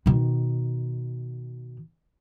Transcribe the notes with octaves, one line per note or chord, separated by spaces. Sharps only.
B2 D#3